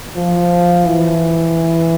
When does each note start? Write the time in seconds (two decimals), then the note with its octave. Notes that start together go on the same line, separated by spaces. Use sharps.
0.16 F3
0.85 E3